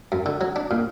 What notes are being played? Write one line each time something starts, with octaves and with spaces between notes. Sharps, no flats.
F#2
D3
F#3
D4
A#2